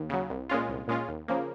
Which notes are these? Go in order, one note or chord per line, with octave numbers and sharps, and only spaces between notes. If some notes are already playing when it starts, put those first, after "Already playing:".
Already playing: D#2
C#3 F#3
C2
A#2 G#3 C#4 F4
C2
A#2 G#3 C#4 F4
D#2
C#3 F3 A#3